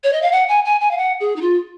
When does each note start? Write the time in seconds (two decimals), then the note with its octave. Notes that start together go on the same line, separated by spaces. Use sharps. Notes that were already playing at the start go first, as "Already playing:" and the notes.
0.04 C#5
0.13 D#5
0.22 F5
0.32 F#5
0.49 G#5
0.65 G#5
0.81 G#5
0.91 F5
0.97 F#5
1.20 G#4
1.36 D#4
1.41 F4